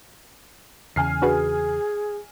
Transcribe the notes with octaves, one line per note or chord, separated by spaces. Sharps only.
E2 C#3 G#5 F6 C7
D4 F#4 G#4 B4